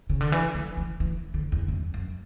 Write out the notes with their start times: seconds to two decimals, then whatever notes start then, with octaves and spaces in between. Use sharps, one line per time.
0.10 C#3
0.21 D3
0.32 E3
0.55 F#3
0.77 E3
1.00 E3
1.34 D3
1.52 E2
1.68 F#2
1.94 F#2